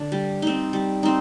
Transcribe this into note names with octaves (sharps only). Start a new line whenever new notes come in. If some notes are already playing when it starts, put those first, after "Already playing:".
Already playing: D3 D4
G3
C4 D#4
G3
C4 D#4